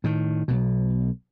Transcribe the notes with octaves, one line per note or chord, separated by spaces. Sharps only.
A2 D#3
B1 B2